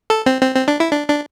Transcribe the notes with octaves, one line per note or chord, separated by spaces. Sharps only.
A4
C4
C4
C4
D4
E4
D4
D4